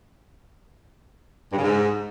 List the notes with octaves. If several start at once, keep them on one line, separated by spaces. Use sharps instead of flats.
G2
C#3
G#2